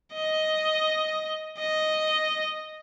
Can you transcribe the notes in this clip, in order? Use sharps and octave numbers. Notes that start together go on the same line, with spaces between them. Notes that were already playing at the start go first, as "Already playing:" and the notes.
D#5
D#5